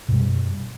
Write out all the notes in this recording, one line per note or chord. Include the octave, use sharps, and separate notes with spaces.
F#2 B2 G3